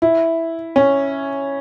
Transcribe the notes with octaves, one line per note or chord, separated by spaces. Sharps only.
E4
C#4